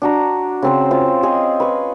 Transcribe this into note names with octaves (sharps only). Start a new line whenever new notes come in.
D4 F#4 A#5
C#3 C4 C5
F4 C5 F5
C4 G#4 D#5 G#5
B4 C#6